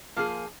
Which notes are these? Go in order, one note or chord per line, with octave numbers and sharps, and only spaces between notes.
F3 A#3 F4 G#4